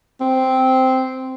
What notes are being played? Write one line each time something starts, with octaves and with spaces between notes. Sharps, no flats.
C4